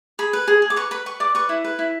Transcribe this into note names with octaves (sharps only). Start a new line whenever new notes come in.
G#4 B5
B4
G#4
G#4
D6
B4 C#6
B4 B5
B4 C#6
D5 D6
B4 C#6
E4
B4
E4